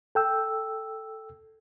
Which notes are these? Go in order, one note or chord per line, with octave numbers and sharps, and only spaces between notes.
A4 G5 E6